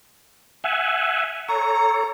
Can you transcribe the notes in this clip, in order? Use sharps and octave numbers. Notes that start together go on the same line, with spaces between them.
E5 F#5 G#5
A4 C#5 A#5